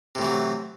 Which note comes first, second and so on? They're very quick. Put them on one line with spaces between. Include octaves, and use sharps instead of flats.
C3 A2 E3 F#3